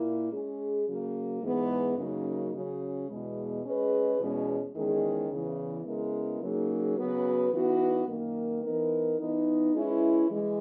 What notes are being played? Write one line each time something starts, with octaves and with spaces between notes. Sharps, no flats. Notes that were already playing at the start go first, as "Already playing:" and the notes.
Already playing: A#2 A#3 E4
G#3 C#4 G#4
C#3 F#3 A#3
G#2 E3 G#3 B3
F#2 C#3 F#3 A#3 D#4
C#3 F#3 C#4
E2 B2 G#3
G#3 C#4 G#4 B4 D#5
E2 B2 G#3 C#4
E2 D#3 G#3 C#4 G#4
E2 C#3 E3
C#3 G#3 B3 E4 A#4
C#3 F#3 A#3 D#4 G#4
C#3 F#3 B3 F#4 B4
E3 B3 D#4 F#4
F#2 D#3 A#3
E3 B3 D#4 A#4
E3 B3 D#4
G#3 C#4 E4 B4
E3 G#3